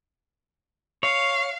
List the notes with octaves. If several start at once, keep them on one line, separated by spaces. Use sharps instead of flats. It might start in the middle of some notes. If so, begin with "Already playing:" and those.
C#5 F5